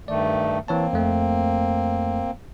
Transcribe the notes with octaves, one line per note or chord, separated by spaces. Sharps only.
G2 D#3 A3 D5
E3 A#3 C4 C#5 A5
F2 A3